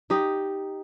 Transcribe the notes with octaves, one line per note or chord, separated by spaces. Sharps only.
D#4 G4 D#5